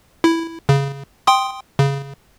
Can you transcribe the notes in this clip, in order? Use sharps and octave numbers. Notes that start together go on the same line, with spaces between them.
E4
C#3
G5 C6 D#6
C#3